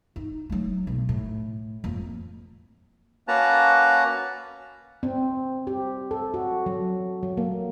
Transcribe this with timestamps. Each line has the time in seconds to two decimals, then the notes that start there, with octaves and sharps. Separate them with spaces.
0.16 D#4
0.50 F#3 A3
0.87 B1
1.09 A2
1.84 F2 A#3
3.28 A#3 C#4 F#4 B4 A5 A#5
5.03 C4
5.67 G4
6.11 A4
6.34 F#4
6.66 F#3
7.23 F#3
7.37 A#3